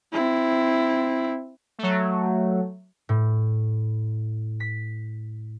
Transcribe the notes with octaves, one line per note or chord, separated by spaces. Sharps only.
C4 E4
F#3 A3
A2
B6